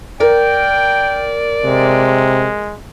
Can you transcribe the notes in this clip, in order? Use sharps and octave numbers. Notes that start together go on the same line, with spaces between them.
A#4 D5 G5
C3 G#3